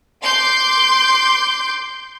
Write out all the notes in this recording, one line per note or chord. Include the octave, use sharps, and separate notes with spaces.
C6 D6 G6